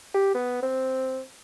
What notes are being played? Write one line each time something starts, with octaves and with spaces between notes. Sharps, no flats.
G4
B3
C4